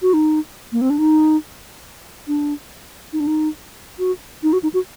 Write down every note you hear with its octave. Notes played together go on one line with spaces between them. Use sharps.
F#4
D#4
A#3
C4
D4
D#4
D4
D#4
D4
D#4
F#4
D#4
F#4
D#4
F#4